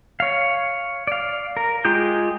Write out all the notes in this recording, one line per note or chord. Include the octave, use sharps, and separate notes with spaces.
C#5 F5
D5 F5
A#4
G#3 F4 G4 G#4 G6